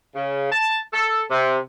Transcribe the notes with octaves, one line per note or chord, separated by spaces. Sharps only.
C#3
A5
A4
C3